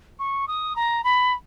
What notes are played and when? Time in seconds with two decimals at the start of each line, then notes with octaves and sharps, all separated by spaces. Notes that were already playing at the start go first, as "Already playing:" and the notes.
0.19 C#6
0.48 D#6
0.76 A#5
1.04 B5